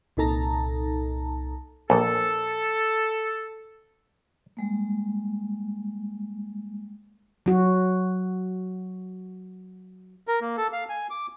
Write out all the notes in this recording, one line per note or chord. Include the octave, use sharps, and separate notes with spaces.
C2 A#2 D#4 A4 A5 A#5
A#1 A4
G3 G#3 A#3
F#3 F#4
A#4
A#3
A4
F5
G#5
D6